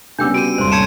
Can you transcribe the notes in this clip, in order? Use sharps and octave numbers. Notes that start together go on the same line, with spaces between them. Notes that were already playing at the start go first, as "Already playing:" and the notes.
C#3 G3 B3 D4 G5 D6 E6 G6
F#4 G4 D7 D#7
D#1 G2 C3 C5 C6
G4 C#5 A5 B5 G#6 C#7 E7